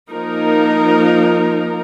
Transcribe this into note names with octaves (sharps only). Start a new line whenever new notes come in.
F3 A#3 D#4 A#4